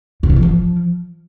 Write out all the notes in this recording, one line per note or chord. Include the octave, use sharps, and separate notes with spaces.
C3
D#3
E3
F3